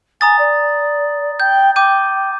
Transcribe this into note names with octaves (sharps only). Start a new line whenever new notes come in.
G#5 A#5 D#6 A6
D5
G5 G6
G5 D6 G6 D#7